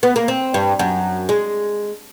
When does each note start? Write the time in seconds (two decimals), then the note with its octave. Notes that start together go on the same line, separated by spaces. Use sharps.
0.03 B3
0.16 A#3
0.28 C4
0.54 G2
0.79 F#2
1.29 G#3